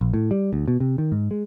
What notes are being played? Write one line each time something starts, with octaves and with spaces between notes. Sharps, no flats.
A#1
A2
G3
D2
B2
C3
D#3
G#2
G#3